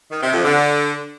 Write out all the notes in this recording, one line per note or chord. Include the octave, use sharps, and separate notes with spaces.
D#3
C3
F2
D3